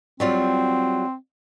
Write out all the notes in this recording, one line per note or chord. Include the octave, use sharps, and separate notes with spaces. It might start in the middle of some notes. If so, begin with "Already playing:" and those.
F#3 G3 C4 F4